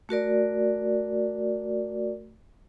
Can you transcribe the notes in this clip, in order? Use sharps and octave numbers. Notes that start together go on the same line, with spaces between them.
A3 F#4 A#4 D5